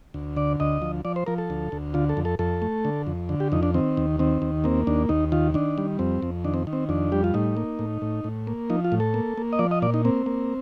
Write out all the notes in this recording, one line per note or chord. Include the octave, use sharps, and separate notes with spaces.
D2
D3 D5
D2 D#5
F3
F3 D5
C5
F3 A#4
A4
D2
D2
D3 F4
A4
F2
A4
F2 A4
A3
D3
F2
D3
G4
F2 D#4
D4
D#3 C4
D#2
D#3 C4
D#2
A#3 C4
D#2 D4
D#2 D#4
D#3 F4
D#3 D4
G3
F2 C4
F2
D#3 D4
C4
D#3
C4
F2 D4
G3 G4
F4
A2 D#4
A#3
A2
A2
A2
A#3
F3 D#4
F4
A2
A4
A#3
A#3
D#5
F3 D5
D#5
A#2 D5
D#4
A#3 C4
A#3